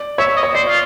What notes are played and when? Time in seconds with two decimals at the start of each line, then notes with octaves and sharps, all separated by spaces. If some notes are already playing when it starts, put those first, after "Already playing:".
Already playing: D5
0.18 C#5 E5
0.37 D#5
0.43 C#5
0.55 C5 D5
0.68 F4